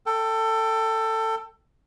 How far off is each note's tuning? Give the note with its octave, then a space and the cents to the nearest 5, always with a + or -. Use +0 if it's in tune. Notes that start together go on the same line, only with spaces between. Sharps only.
A4 +20 G5 +0